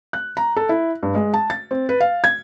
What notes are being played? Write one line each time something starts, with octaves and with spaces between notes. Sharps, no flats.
F#6
A#5
A4
E4
G2
G#3
A5
A6
C4
B4
F5
G#6